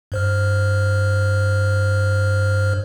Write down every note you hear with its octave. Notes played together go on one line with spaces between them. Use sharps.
G2 C5 F6